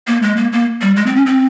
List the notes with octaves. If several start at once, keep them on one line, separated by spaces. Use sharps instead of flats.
A#3
G#3
A#3
A#3
G3
G#3
C4
C#4
C4